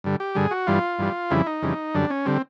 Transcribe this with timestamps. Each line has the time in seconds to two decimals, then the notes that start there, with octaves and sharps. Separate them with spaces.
0.04 G2 D3 G3
0.20 G4
0.35 G2 D3 G3 G#4
0.51 F#4
0.67 G2 E3 G3 F4
0.99 G2 E3 G3
1.31 F2 C#3 E3 G3 E4
1.46 D#4
1.62 F2 C#3 E3 G3
1.94 F#2 D3 G3 D4
2.10 C#4
2.25 D3 G3 C4